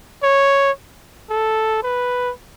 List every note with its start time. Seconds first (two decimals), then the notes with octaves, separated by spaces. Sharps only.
0.23 C#5
1.30 A4
1.83 B4